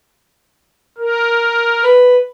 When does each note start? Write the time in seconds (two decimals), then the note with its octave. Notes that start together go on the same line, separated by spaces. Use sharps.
0.98 A#4
1.84 B4